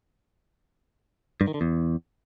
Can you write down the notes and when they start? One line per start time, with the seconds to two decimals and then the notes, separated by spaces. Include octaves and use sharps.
1.41 G2
1.47 D#3
1.54 D3
1.61 E2